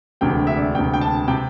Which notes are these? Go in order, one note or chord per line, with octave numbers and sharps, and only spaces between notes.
E1 D2 C3 G5
E5
D5
E1 D2 C3 G5
G5
A5
C3 G5